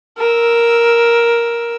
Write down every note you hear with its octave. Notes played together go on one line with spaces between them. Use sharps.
A#4 E6